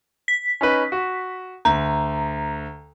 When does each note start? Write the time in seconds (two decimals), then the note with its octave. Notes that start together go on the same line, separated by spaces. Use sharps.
0.28 B6
0.61 C#4 D#4 B4
0.92 F#4
1.65 D2 A#5